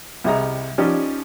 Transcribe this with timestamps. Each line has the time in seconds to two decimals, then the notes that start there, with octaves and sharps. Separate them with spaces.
0.24 C2 C3 G3 G#4 D#5 A#5
0.78 F3 C#4 D#4 G4 D5